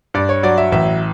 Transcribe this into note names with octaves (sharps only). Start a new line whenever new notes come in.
G2 D5
C#5
F#3 D5
E5
A1 E5